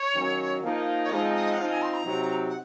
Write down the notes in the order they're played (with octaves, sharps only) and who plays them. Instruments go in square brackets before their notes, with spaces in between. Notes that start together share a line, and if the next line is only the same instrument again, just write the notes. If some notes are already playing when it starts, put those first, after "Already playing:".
Already playing: [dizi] C#5
[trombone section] D#3 F#3 A#3 C#4
F3 A#3 D#4
[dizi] C#5
[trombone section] F3 G#3 C4 D#4 [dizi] D#5
[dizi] D#5
F#5
[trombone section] F3 C4 D#4 [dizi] F5
[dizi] G#5
C6
A#5
[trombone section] C3 F#3 C4 D#4
[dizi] F#5